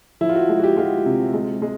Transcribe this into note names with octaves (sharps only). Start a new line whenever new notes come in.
F3 E4
F4
F#4
G#3
F#4
G4
G#3 F4
C3
G#3
G#3